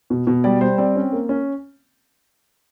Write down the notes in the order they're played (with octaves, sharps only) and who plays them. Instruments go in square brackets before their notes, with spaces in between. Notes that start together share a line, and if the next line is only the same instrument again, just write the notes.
[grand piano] B2
B2
G3 D5
G3 C5
C4 D5
C#4
A#3
C#4